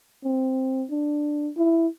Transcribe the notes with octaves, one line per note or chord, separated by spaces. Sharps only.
C4
D4
E4